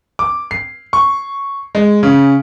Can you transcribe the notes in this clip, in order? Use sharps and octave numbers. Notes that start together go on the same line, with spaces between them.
D6
C7
C#6
G#3
C#3